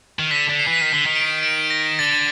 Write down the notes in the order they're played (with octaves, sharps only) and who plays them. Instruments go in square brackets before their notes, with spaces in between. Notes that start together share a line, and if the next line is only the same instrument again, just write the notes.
[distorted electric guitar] D#3
[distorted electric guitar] D3 [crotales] B6
[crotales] B6
[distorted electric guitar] D3
[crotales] C7
[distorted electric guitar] E3
[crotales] B6
[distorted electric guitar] D#3
[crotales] B6
[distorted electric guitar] D3
D#3
[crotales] D7
D7
A#6
[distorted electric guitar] D3 [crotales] A6